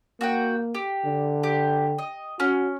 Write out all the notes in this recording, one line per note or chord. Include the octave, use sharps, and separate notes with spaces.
A#3 F#4 F#5 G5
G4
D3
G4
D#5
C#4 F#4